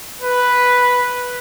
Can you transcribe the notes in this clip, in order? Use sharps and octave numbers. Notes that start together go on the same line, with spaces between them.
B4